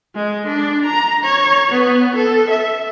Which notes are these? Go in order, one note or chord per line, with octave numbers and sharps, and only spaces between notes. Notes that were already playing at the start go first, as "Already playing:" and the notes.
G#3
D4
A#5
C#5
B3
A4
E5